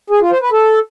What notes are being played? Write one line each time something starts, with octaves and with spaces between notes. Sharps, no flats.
G#4
F4
C5
B4
A4